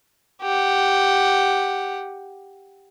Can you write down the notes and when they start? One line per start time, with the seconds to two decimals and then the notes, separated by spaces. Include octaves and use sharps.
0.42 G4 F#5